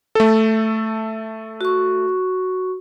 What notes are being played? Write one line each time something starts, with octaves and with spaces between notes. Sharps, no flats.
A3 A4
F#4 C#6